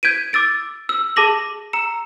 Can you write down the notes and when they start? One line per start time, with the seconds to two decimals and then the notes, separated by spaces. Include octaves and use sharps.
0.03 G6 G#6 B6 D7 D#7
0.33 D6 E6 A6 D7
0.89 E6
1.16 G#4 A5 D6 A#6 F#7
1.73 A#5 E6 C#7 E7